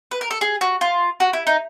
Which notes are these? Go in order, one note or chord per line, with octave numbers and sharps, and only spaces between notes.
B4
A#4
A4
G#4
F#4
F4
F#4
E4
D#4